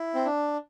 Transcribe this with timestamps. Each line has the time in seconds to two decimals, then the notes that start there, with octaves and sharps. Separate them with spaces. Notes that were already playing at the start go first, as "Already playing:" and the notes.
Already playing: E4
0.15 C4
0.25 D4